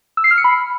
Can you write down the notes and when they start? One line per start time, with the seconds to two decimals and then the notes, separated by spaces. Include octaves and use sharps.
0.17 E6
0.24 C7
0.31 F6
0.38 C#7
0.44 B5